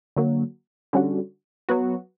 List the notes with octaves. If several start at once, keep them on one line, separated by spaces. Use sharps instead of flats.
D3 F#3 A#3
D3 G3 C#4 F#4
F#3 B3 F#4